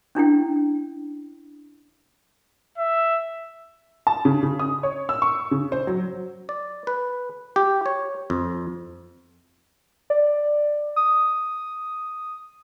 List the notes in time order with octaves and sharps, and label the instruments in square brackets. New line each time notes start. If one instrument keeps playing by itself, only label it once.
[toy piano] C#4 D4 E4 G5
[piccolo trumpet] E5
[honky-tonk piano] A5
C#3
C#3
D#6
C#5
E6
C#6
C#3
C5
F#3
[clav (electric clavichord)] D5
B4
G4
C#5
F2
[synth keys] D5
D#6